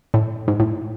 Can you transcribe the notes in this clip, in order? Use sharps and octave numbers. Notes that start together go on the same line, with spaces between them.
A2
G#2
A2